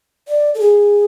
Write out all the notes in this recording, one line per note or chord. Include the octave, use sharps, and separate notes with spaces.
D5
A4
G#4